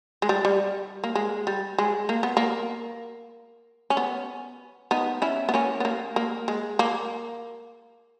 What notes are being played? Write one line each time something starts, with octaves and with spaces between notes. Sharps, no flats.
G#3
G3
G3
A#3
G#3
G3
G#3
A#3
B3
A#3
C#4
B3
B3 D#4
C#4 E4
B3
A#3 C#4
B3
A#3
A#3
G#3
A#3